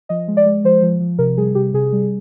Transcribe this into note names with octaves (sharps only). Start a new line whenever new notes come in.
F3 D#5
G#3
D5
G#3
F3 C5
F3
F3
C3 A#4
G3 G#4
C3 G4
C3 G#4
G3